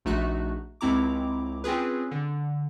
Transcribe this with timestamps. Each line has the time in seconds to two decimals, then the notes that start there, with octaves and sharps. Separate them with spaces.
0.05 A#1 A3 D#4 F#4 F#6
0.81 C#2 C4 E4 A#5 D6
1.64 C4 C#4 F4 G#4 B4
2.11 D3